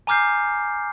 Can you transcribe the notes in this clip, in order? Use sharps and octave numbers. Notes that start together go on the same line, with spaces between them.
G#5 A#5 D6 F6 G6 C7